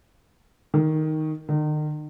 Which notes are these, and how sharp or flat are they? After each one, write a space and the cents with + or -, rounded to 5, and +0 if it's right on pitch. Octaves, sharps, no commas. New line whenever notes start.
D#3 +5
D#3 -40